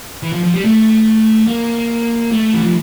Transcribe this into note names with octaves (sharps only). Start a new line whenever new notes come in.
E3
F3
F3
G3
A3
A#3
A3
E3
F3